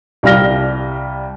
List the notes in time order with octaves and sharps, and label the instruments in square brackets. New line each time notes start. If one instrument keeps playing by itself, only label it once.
[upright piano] C2 G3 F5 F6 A#6 G7